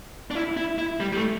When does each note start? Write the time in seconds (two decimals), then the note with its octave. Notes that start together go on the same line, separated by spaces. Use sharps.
0.31 D4
0.35 E4
0.57 E4
0.78 E4
1.00 G3
1.12 G3
1.16 A3